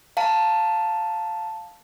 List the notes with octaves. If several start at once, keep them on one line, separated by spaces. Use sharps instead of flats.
F5 A5 A#5